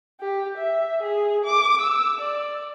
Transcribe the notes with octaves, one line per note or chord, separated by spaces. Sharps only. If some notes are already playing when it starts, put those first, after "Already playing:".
G4
E5
G#4
D6
E6
D5